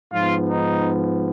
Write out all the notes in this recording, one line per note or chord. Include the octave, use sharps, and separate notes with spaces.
G#2 F3 B3 F4
D#4